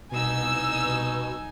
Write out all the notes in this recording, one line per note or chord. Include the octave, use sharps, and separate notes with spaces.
C2 B2 D#4 G#5 E6